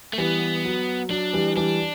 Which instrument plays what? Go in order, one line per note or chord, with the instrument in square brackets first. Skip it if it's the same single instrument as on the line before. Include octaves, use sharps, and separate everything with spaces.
[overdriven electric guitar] A3
[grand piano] E3 G3 [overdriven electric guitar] B3
[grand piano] F#3
[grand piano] F#3 [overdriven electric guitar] D4
[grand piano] E3 G3
[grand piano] E3 G3 [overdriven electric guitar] D4